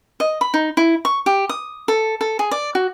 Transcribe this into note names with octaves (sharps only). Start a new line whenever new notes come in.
D#5
B5
D#4
E4
C#6
G4
D#6
A4
A4
G#4
D5
F#4